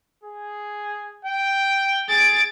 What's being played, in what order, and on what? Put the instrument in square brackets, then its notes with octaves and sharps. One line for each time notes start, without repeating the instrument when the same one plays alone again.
[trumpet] G#4
G5
[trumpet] G#4 [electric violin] A6 D7